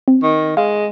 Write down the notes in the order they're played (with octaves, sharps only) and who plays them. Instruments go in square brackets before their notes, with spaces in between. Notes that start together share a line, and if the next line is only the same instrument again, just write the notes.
[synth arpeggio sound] C4
[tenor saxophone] D#3
[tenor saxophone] G#3 [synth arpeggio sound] F5